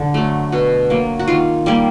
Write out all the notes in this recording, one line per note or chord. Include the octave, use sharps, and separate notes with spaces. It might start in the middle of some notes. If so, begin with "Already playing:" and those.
Already playing: D3 A4
F#3 A3
B2 F#4
F#3 A#3
F#4
D#3 F4
G3 A#3